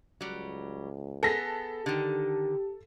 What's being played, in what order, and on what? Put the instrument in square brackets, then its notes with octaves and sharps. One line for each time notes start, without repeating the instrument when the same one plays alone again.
[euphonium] C#2 [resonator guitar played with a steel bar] F#3 G3
[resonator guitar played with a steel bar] B3 G#4 [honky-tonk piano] A4 A#6 B6
[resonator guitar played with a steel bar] D3 D#3 [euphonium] G4